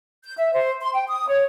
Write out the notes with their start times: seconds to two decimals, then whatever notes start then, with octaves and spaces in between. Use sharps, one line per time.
0.24 G6
0.38 E5
0.52 C5
0.81 C6
0.93 G5
1.09 D#6
1.28 C#5